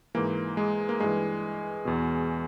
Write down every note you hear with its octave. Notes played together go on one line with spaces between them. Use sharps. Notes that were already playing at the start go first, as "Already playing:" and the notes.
G#2 E3 A#3
G#3
A#3
G2 E3 G#3
E2 B2